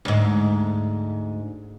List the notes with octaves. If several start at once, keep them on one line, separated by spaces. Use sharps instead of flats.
D2 G#2